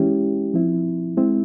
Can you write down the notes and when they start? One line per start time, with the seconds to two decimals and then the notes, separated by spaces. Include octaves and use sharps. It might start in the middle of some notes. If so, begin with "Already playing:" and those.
Already playing: E3 G#3 C#4 E4 G4
0.54 F3 C4 E4
1.17 G#3 C4 E4